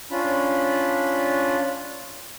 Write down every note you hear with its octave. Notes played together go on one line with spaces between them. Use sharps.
C#4 D4 F4 B5